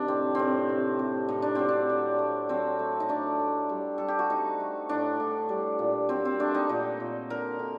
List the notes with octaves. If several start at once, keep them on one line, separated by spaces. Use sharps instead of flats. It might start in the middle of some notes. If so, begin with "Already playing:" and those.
Already playing: C3 D#3 D4
A2 C4
A2 C4
C3
C3
A2 D#4
D4
F#3 C4
D4
D3
A3
F#3 C4
A3
D#4
A3 D4
A3
G3
G3 A4
G4
F#4
A3 D#4
A3
A2 D4
A2
G3
A#2
F#3 C4
C4
A3 D4
D#4
A#2 D#4
A#2
D3 A#4
D3